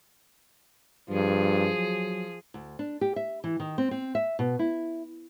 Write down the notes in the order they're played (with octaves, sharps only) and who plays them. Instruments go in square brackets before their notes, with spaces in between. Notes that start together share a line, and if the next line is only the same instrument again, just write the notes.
[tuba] G2 [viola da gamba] F3 G#4
[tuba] F#3
[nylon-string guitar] D2
D4
G4
E5
E3
D#3
C4
C4
E5
B2
E4